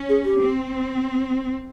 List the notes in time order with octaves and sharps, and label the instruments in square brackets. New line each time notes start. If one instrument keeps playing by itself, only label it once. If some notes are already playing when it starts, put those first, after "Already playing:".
Already playing: [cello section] C#4
[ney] G#4
G4
[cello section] C4